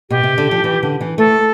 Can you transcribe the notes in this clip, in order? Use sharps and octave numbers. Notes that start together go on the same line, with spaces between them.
B2 G4
C3
D3
F3
E3
D3
E3
A3 A4